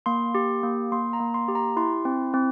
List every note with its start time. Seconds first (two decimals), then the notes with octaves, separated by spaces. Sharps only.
0.06 A#3 C6
0.35 G4
0.63 A#3
0.92 A#3 C6
1.13 A#5
1.20 A#3
1.34 C6
1.48 G4
1.55 A#5
1.76 E4 C6
2.05 C4
2.34 C4